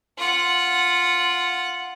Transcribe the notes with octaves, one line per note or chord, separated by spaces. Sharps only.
F4 F#5